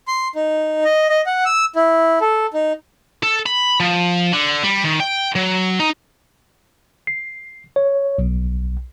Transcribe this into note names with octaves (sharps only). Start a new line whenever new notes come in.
C6
D#4
D#5
D#5
F#5
E6
E4
A4
D#4
A4
B5
F3
D3
G3
D#3
G5
F#3
D#4
C7
C#5
B1